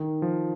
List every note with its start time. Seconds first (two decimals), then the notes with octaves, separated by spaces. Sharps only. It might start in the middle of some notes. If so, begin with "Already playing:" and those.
Already playing: D#3
0.22 F3